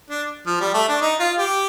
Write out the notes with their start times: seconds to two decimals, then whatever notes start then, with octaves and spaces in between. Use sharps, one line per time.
0.10 D4
0.47 F3
0.61 G3
0.74 A3
0.88 D4
1.02 D#4
1.20 F4
1.39 G4